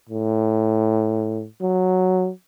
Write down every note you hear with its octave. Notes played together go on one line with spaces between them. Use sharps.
A2
F#3